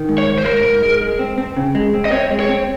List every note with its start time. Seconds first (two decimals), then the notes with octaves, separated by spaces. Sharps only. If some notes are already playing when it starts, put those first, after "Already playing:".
Already playing: D#3
0.09 G#2
0.18 C#5
0.27 G#2
0.38 C5
0.45 G#2 A#4
0.64 G#2
0.82 G#3
1.01 G#3
1.19 C4
1.38 C4
1.56 C#3
1.75 G#3
1.94 C4
2.05 D#5
2.12 C4 C#5
2.31 G#3
2.40 C#5
2.49 C4